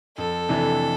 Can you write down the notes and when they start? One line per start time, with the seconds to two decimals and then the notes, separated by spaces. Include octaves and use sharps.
0.17 F2 A4
0.49 C3 E3 A3 D4